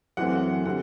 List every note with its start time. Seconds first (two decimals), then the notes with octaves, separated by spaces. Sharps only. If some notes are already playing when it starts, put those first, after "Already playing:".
0.17 F#2 E3 A3 C4 F#5
0.65 D3 G3 C4 F#5